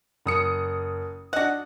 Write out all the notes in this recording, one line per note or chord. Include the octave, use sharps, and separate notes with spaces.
F#1 D#6 C#7
D4 F#4 D#5 F#5